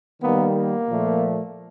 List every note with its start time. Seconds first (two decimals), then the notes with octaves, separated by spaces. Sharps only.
0.22 D#3 G3 A#3 B3
0.55 A#3
0.88 A#2 F3 A3